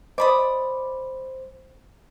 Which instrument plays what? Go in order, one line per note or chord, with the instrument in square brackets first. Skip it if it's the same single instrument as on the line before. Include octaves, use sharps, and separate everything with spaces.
[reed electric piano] C5 [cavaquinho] D5 B5 D#6 [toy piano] D#5